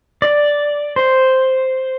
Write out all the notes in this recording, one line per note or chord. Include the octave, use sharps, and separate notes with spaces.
D5
C5